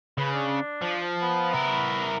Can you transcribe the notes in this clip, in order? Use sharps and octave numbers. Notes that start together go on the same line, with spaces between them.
C#3 B4
D4
F3
B3
E4 A#4